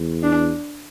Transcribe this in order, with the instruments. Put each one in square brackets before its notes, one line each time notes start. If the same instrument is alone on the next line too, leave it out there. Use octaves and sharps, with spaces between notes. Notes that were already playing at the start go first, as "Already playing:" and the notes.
Already playing: [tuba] E2
[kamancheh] D4